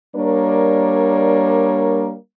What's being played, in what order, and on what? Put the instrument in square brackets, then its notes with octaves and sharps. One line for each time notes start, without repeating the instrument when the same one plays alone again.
[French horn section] G3 A#3 D4 A#4 C#5